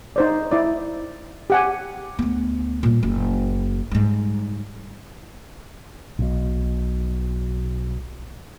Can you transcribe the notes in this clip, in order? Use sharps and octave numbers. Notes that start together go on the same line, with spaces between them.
D#4 C5 D5
E4 D5
G4 F#5 G#5
D2 B3
A#2 G3
F#1
G#2 G3
B1 B2